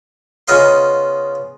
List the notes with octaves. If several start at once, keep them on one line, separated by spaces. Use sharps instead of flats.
C#3 B3 F4 D#5 F5 C6